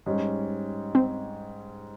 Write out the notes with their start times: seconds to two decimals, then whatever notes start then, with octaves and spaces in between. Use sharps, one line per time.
0.06 G#2 G3 C#4
0.95 C4